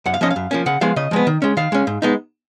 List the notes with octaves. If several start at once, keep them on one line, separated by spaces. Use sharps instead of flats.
F#2 F#5
F5
F3 A#3 C#4 D#5
F5
F#2
F3 A#3 C#4
C#3 F#5
F3 G#3 B3 F5
C#3 D#5
F3 G#3 B3
D#3
G#3 C#4
D#3 F5
G#3 C#4
G#2
G#3 B3 D#4